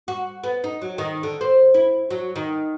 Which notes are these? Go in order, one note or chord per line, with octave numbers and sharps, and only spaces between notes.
F#4
B3
D#4
F#3
D#3
D3
C5
E4
F#3
D#3